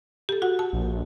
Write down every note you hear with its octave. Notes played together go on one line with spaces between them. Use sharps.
G4 A4
F#4 F#5
A5
A#1